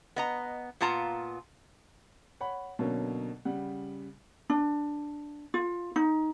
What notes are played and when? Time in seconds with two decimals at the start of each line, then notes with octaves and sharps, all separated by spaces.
0.16 B3 D#5 A#5
0.81 A#2 B3 F4 A5 A#5
2.40 C#5 F#5 B5
2.79 B2 D3 F#3 A#3 C#4
3.45 C#3 G3 F#5
4.50 D4
5.54 F4
5.96 D#4